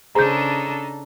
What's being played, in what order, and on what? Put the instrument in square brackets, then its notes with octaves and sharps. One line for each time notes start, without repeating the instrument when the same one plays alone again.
[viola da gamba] C#3 D4 A4 [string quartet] D#4 [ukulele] G#4 C5 [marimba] A#5 G6